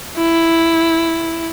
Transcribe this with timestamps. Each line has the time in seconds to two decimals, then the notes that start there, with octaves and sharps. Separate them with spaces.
0.17 E4